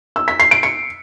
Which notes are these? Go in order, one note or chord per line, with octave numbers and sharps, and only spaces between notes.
E6
B6
C7
D7
C#7